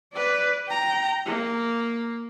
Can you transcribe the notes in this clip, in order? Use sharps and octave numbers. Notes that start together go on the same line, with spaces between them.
B4 D5
G5 A#5
A#3